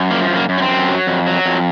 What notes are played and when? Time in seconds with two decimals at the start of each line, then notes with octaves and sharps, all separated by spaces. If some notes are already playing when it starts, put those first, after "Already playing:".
Already playing: F#2
0.10 F3 A#3
0.30 F#2
0.36 A#3
0.49 F#2
0.58 C#4
0.62 C4
0.69 F#2
0.88 F#3
1.07 F2
1.27 F#3
1.46 F2